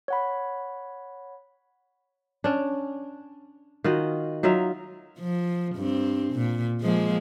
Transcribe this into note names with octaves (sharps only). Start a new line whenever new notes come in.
C#5 F#5 B5
C#4 D4
D#3 F4 F#4 D#5
F#3 D#4 F4 E5
F3
G2 C4
A#2
F3 G#3 A#3